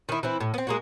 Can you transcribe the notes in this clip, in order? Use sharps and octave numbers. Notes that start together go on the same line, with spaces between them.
D#3 E4
E3 C4 E4
A2
B3 C4
G#3 A#3 F#4